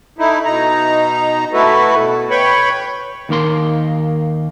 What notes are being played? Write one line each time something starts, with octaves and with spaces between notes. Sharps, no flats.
A3 D#4 E4
B2 D#4 A#5
A3 E4 F#4 A4 B4
B2
B4 C#5 G5 B5 C#6
D#2 D#3 A#3 C6